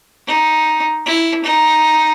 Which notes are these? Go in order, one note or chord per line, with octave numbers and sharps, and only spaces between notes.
D#4
E4
D#4